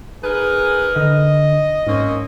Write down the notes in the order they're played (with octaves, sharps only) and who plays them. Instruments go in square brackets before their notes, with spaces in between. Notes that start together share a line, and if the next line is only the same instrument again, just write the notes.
[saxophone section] D#4 A#4 B4 [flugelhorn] G#4
[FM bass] D3 [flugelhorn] D#5
[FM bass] G#2 [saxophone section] A#3 C4 C#4